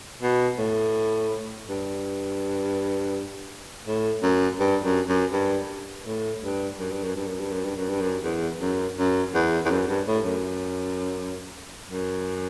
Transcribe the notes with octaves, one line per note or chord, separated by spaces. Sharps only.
B2
A2
G2
A2
F#2
G2
F#2
F#2
G2
A2
G2
F#2
G2
F#2
G2
F#2
G2
F#2
G2
F#2
G2
F#2
E2
F#2
F#2
E2
E2
F#2
G2
A2
F#2
F#2